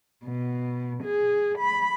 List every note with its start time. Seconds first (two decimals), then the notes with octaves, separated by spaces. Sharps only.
0.23 B2
1.02 G#4
1.57 B5